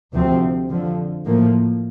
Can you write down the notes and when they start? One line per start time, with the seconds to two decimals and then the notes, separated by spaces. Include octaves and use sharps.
0.13 D2 C3 F3 C4
0.70 F2 D3 F3
1.26 A2 F3 A#3